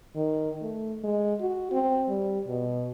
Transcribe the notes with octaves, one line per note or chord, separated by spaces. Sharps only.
D#3
A3
G#3
F#4
C4
G3
B2